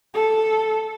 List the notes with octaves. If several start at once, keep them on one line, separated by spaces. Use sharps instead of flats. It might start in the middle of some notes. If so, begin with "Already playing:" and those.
A4